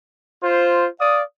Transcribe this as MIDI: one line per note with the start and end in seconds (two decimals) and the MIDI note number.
0.43 0.87 65
0.43 0.87 72
1.00 1.22 74
1.00 1.22 77
1.00 1.22 87